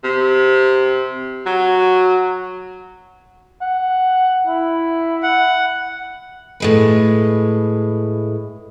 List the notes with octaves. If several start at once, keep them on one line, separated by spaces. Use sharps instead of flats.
C3
F#3
F#5
E4
F#5
A2 G#3 B4